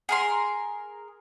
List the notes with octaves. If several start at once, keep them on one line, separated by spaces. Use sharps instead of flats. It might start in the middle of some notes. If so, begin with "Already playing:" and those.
G#4 A#4 C6